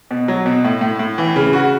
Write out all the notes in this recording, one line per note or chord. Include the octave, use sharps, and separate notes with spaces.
B2
F#3
B2
A2
A2
A2
E3
C#3
F#4